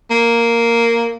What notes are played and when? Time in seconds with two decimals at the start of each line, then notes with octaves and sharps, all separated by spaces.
0.11 A#3